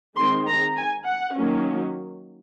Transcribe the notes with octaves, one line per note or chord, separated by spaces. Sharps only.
D#3 G#3 C4 C6
A#5
G#5
F#5
D#3 F#3 A#3 C#4